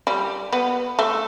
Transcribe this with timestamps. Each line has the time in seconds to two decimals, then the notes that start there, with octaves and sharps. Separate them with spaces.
0.07 G3
0.53 B3
0.99 A3